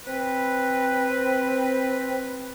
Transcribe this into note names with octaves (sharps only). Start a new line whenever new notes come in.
C4 B4